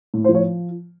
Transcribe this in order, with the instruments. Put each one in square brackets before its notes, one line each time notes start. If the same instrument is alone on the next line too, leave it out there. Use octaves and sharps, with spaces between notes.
[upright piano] A2
C5
F3
C#5